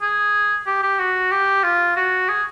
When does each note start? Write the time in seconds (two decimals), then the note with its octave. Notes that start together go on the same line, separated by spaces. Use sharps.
0.02 G#4
0.66 G4
0.83 G4
0.99 F#4
1.31 G4
1.63 F4
1.96 F#4
2.28 G#4